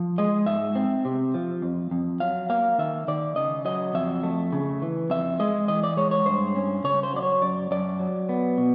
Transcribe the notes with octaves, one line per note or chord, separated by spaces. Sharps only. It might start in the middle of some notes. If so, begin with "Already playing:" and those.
Already playing: F3
G#3 D#5
G#2 E5
C4
C3
F3
F2
F2
F#3 F5
A#3 F5
D#3 E5
D#3 D5
C#3 D#5
F#3 D#5
F2 E5
A3
C#3
E3
F2 E5
G#3 D#5
E3 D#5
D5
G#3 C#5
C#5
G2 C5
C#4
C#3 C#5
C5
F#3 D5
C#5
F#2 D5
F#2 D5
F#3
B3
B2